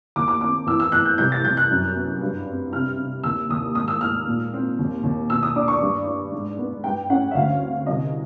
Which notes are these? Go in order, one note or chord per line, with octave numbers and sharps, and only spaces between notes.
D#2 D6
D6
C4 D6
E2 E6
E6
E2 F#6
G6
C2 G6
A6
C2 G6
F#6
F#2
B3
G2
C4
C3 F6
C3
D#2 E6
D#2 D#6
G#2 D#6
E6
G#2 F6
A#2
C4
D#2
D#2
B2 E6
D#6
D4 D6
C#6
G2
D4
G#2
B3
G2 G5
C#4 F#5
E5
D2 F5
C4
C2 D#5